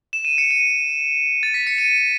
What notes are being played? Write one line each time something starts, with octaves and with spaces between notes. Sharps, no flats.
E7
D#7
C#7
D#7
A6
B6
C#7
D#7